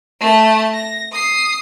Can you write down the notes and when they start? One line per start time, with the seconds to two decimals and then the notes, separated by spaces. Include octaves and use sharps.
0.20 A3 A5
0.74 A#6
1.12 D#6 C7